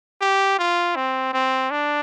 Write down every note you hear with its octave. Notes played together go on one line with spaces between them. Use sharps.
G4
F4
C4
C4
D4